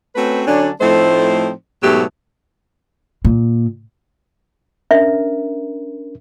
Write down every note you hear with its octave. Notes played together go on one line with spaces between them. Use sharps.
A3 C4 C#4 F#4 B4
D3 F#3 C#4 D4
A2 F3 A3 C4 D#4 C5
G#2 B2 F#3 A3 B3 G4
A#2
C#4 D4 A#4 E5